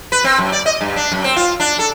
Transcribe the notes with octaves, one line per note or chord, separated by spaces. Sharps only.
B4
C4
F#2
D5
D#5
G2
D4
F#2
C4
F4
D4
A4